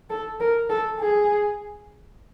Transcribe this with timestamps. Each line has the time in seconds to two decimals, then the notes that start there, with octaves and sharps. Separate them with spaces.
0.10 A4
0.40 A#4
0.70 A4
0.99 G#4